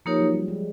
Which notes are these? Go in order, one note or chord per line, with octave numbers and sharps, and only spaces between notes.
F3 A#3 D#4 G4 A#4 C#5
F#3
G3
G#3